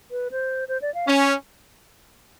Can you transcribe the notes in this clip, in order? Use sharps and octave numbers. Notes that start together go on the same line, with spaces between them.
B4
C5
C5
D5
F5
C#4